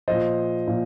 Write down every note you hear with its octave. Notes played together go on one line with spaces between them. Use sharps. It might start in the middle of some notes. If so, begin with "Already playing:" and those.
A#2 F3 C5 D#5
A#2 F3